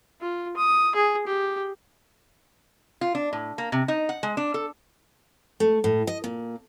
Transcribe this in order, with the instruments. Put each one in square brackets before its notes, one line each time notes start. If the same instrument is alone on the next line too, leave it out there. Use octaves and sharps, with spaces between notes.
[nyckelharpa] F4
D#6
G#4
G4
[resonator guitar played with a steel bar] F4
D4
A2
A#3
C3
D#4
F#5
G#3
D4
A4
[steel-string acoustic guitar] A3
A2
D#5
A#2